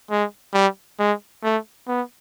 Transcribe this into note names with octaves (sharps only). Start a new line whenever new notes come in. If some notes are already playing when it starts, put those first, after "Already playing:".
G#3
G3
G#3
A3
B3